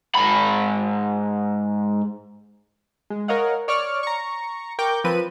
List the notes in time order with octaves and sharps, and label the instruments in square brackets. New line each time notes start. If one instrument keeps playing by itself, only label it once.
[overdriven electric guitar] G#2 B5
[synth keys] G#3
A#4 C#5 D#5 F5 F#5
C#5 D5 C#6 F6
A#5 C#6
A#4 G5 C#6 D6 G6
F3 C4 B4 D#7